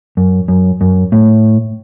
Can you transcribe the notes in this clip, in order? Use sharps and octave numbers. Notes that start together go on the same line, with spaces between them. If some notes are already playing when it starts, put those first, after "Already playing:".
F#2
F#2
F#2
A2